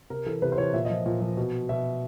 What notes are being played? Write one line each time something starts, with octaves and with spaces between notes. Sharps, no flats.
C3 A#4
E3 A4
C3 B4
C5
E3 C#5
A#2 E5
D#5
F3
A#2
F3
B2
B2 E5